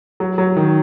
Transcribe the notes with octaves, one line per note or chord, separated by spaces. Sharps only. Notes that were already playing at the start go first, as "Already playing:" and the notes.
F#3
F#3
D#3